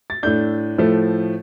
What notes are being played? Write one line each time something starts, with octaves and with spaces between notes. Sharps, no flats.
A6
A2 A3 D4 G6
A2 F3 A3